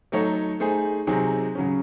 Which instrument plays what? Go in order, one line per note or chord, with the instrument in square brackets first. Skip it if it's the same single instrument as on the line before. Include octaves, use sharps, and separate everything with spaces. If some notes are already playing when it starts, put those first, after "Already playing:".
[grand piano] F#3 A3 D#4 A4 C#5
A3 D#4 G#4 C5
C3 F#3 C4 D#4 G#4
C#3 F#3 C#4